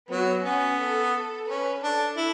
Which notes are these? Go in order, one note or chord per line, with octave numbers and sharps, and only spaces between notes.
F#3 B3
B3 C#4
A4
C#4 B4
D4 A4
E4